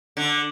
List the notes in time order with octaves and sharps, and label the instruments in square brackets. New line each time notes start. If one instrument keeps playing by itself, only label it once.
[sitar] D3